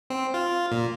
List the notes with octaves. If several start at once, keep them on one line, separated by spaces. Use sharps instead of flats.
C4
F4
A#2